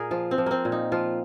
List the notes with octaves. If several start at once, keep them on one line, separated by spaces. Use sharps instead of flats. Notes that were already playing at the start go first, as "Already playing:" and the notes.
Already playing: A#2 G#4 A#4
F3 F4
C4
F3
A#3 C4
A#2
D#4
F3 F4